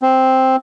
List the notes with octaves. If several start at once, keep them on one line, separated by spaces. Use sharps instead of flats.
C4